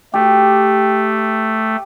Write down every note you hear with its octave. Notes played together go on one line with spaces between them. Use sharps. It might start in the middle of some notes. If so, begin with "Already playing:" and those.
A3 G4